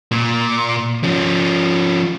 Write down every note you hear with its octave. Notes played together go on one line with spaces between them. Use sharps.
A#2
F3 C#4